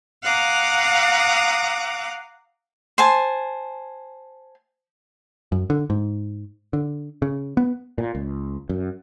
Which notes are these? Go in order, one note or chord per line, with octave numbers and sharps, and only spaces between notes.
F5 F#5 A#5 D6 D#6
C5 G#5 A5
F#2
D3
G#2
D3
C#3
B3
A#2
C#2
F#2